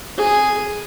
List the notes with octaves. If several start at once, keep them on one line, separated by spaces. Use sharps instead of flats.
G#4